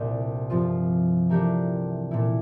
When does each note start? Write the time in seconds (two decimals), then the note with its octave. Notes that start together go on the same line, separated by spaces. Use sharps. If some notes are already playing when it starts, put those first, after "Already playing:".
Already playing: C2 A#2 A3 D4 G4
0.50 G2 F3 C4 F4
1.29 E3 A3 D4 G4 A#4
2.11 A#2 A3 E4